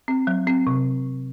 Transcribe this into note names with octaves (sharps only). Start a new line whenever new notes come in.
C4
F#3
C4
C3